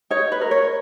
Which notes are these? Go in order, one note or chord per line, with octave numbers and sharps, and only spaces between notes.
D#4 C#5
B4
A#4
C#5